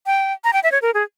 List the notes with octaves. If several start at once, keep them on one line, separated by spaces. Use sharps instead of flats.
G5
A#5
G5
E5
C#5
A#4
G#4